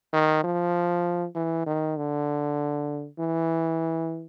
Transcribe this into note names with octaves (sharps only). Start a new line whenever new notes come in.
D#3
F3
E3
D#3
D3
E3